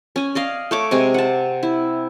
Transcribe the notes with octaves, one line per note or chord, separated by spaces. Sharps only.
C#4 G#5
D5 D#5 F5
A3 C#5 D6
C3 G#3 G#5
F#5 A5
E4